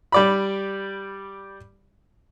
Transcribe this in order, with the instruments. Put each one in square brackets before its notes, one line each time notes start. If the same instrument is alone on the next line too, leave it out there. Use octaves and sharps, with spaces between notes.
[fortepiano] G3 D5 B5